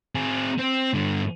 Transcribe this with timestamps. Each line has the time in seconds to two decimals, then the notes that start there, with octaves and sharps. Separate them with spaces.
0.15 C4 G#4
0.59 C4
0.94 G2 D3